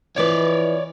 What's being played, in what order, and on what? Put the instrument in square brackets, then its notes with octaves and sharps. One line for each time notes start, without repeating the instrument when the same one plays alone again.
[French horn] E3 [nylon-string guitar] F3 C4 B4 [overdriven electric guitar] C#5 D5